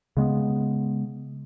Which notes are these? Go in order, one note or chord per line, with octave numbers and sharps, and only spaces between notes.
C#3 G#3 B3